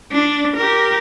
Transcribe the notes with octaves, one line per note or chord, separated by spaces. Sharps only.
D4
G4 A#4